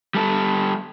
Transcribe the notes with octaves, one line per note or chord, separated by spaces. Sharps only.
G3 A4